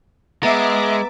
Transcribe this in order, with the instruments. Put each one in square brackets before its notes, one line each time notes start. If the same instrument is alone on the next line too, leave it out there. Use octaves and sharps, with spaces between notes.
[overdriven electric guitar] G#3 [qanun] B3 [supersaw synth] E5 D6 [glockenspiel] A#5 A6